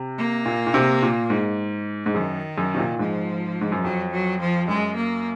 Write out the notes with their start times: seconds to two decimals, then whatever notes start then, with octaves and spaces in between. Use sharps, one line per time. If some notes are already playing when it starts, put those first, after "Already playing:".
Already playing: C3
0.18 A#3
0.46 A#2
0.67 A#2
0.74 C3
1.02 A#2
1.30 G#2
2.06 G#2
2.15 F#2 D#3
2.58 F#2
2.74 C3
2.78 A#2
2.99 G#2 F3
3.61 G#2
3.72 F#2
3.84 F2 F#3
4.12 F#3
4.40 F3
4.68 F#2 G#3
4.96 A#3